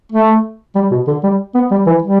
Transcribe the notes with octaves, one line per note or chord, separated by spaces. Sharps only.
A3
G3
B2
D3
G3
B3
G3
E3
G3